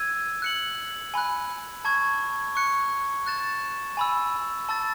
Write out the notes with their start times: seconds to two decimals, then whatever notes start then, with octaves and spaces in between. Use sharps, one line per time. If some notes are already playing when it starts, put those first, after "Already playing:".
Already playing: E6 G#6 D#7
0.42 F#6 C#7 F#7
1.14 G#5 B5 F#6
1.85 A5 C#6 G#6
2.55 C#6 F#6 C#7
3.26 F#6 A6 E7
3.97 G#5 B5 E6
4.69 A5 E6 A6